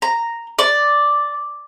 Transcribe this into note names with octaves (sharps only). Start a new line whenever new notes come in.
A#5
D5